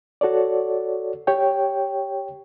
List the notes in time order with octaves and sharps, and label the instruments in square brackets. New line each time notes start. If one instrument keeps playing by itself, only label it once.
[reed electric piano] F#4 A4 C#5 D5
G4 C#5 G5